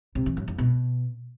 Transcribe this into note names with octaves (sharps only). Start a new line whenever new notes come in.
C3
E3
F#2
F2
B2